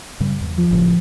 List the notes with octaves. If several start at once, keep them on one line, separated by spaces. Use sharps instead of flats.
G2 C#3 G3
E2
F3
G1 A2 C#3